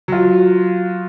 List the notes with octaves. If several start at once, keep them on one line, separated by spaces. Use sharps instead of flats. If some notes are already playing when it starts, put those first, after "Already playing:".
F#3 F4